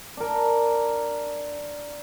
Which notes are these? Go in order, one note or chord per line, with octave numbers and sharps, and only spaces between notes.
D4 A#4